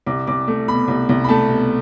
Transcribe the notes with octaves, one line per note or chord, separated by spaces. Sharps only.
C2 D6
C2 D6
A3
B2 B5
C2
C2
B5
A3 A5
B2